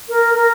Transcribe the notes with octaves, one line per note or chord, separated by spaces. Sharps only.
A#4
A#4